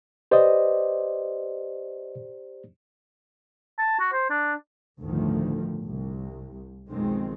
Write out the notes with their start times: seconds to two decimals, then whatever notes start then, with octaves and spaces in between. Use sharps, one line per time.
0.31 G4 B4 C5 D5 D#5
3.79 A5
3.99 F#4
4.13 C5
4.30 D4
5.00 G1 D2 A2 D#3 F3
5.83 C2
6.89 B1 F2 D#3 G#3 C4